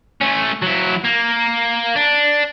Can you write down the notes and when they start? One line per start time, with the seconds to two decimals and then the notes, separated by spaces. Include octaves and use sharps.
0.21 A3 C#4
0.63 F#3 E4
1.05 A#3
1.96 D4